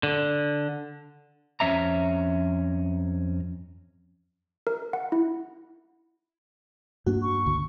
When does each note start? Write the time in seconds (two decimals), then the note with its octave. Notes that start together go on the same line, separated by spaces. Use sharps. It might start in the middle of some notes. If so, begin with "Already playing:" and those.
0.03 D3
1.60 F2 C#4 E5 A#5
4.67 A#4
4.93 F#5
5.12 E4
7.06 G2 A#3 D4 F#4
7.22 C#6
7.46 C#2 D3